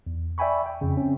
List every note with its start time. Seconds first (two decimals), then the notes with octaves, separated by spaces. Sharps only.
0.07 E2
0.38 D5 E5 G5 G#5 B5 C#6
0.66 G5
0.81 F2 C#3
0.97 C4 C#4